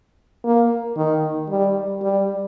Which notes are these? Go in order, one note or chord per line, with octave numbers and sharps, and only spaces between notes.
A#3
D#3
G3
G3